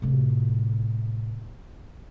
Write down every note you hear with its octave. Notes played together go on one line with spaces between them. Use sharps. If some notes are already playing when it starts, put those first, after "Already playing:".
A2 C3